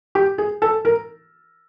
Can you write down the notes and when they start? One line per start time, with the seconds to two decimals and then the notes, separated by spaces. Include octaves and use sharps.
0.15 G4
0.38 G#4
0.62 A4
0.85 A#4